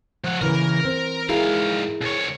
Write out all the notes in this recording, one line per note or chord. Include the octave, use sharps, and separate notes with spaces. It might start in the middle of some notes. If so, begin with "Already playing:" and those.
F3 F#5
C#3 E3 A#3 A#4
C4
G#2 E4 G#4 A#4 F5
C2 C#5